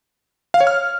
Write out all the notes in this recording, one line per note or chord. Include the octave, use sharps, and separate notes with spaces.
F5
C#5
F6